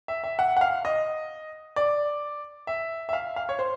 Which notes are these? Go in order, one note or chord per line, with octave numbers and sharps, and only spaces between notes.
E5
E5
F#5
F#5
F5
D#5
D5
E5
E5
F5
F5
C#5
C5